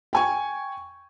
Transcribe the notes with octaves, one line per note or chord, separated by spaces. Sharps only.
G5 G#5 C#6